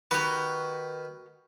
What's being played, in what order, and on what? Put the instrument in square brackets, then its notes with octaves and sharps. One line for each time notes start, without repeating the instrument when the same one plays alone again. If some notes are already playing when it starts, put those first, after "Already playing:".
[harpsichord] D#3 B4 [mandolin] F#4 G4